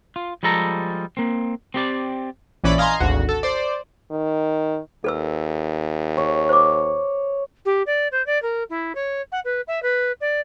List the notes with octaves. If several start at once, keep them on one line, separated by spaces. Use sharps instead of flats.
F4
F3 G3 G#3 A4 A#5
A#3 C4
C4 G4 D5
A#1 E3 C#4 D5 B5
D#5 F5 G#5 A#5 C6
G#1 D2 F#4
A4
C5 D5
D#3
D#2 A4 B4 E6
C#5
C5 D6
G4
D5
C5
D5
A#4
E4
C#5
F#5
B4
E5
B4
D5